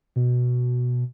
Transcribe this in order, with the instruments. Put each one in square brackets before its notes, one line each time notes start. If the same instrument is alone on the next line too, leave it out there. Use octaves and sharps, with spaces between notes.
[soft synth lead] B2